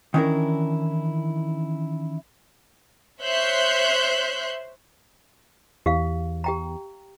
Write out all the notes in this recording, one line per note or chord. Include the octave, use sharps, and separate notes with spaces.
D#3 E3 C#4 D4 E4 A#4
C5 C#5 E5 C6 F#6 G6
E2 G4 F5
G4 G5 A#5